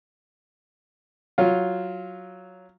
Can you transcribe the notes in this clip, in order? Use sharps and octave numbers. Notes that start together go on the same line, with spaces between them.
F#3 F4